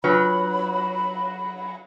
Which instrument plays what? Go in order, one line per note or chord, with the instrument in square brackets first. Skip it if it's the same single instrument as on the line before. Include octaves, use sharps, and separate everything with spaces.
[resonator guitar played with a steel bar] F#3 [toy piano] D4 F4 B4 [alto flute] B5